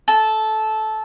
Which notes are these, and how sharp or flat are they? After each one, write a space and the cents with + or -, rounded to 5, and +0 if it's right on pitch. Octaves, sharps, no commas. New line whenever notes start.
A4 -15